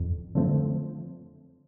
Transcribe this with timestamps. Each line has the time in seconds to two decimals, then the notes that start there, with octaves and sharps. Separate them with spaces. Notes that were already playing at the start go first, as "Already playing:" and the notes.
Already playing: F2
0.35 D3 F3 A3 C4